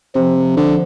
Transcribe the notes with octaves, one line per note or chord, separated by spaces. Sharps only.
C3 F3
D3